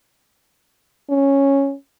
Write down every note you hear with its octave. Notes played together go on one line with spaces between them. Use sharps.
C#4